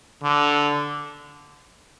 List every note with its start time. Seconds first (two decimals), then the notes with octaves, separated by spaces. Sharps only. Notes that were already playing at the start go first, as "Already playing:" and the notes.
0.23 D3